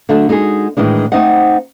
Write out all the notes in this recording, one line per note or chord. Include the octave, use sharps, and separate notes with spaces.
D3 F#3 A3 D4
G#3 D#4 F#4 G#4
A2 D#3 E3 G#3 D4
A3 C4 D#4 C5 D#5 F#5